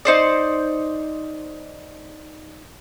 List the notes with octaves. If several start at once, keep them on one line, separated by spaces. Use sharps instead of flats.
D#4 C5 D5